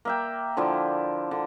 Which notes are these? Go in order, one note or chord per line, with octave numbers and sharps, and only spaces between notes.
A#3 E5 G5
D3 F3 E4 D5
D3